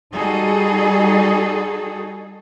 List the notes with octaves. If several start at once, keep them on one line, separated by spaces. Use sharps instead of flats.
G3 D#4 F#4 G#4 A4